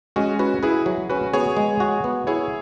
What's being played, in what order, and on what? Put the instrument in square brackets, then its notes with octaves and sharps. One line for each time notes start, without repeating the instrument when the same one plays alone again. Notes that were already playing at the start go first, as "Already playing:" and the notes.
[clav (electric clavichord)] G#3 [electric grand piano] C#4 F#4
[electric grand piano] C#4 F#4 [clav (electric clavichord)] B4
[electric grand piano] E4 G#4 [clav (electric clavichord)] B4
[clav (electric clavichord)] F#3
[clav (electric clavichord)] C#4 [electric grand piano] F#4 B4
[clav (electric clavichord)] B3 [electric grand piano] G#4 C#5
[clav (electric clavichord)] G#3
F#4
B3
[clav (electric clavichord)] E4 [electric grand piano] G#4 C#5